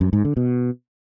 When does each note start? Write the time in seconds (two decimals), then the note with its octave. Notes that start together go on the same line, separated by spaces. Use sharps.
0.01 F#2
0.13 G#2
0.25 D3
0.37 B2